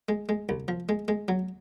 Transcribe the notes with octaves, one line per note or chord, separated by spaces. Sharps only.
G#3
G#3
C2
F3
G#3
G#3
F#3